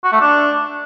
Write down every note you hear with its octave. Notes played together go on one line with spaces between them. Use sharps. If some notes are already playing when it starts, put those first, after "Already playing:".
F#4
A3
D4